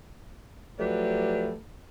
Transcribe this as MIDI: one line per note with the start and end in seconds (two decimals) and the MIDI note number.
0.79 1.54 53
0.79 1.54 54
0.79 1.54 57
0.79 1.54 67
0.79 1.54 71
0.79 1.54 74